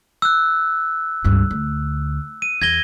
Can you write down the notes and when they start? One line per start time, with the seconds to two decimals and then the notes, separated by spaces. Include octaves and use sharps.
0.22 E6 F#6
1.24 C#2 G2
1.51 D2
2.42 D#7
2.62 E2 G#6 A#6 G7